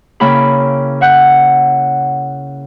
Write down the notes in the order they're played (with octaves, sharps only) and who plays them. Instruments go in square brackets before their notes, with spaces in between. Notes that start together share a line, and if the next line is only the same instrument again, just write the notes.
[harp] C#3 A#3 E4 G5 B5
E5 F#5 F#6 G6